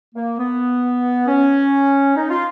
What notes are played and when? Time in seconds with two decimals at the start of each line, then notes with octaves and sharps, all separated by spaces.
0.15 A#3
0.38 B3
1.26 C#4
2.16 D#4
2.30 F4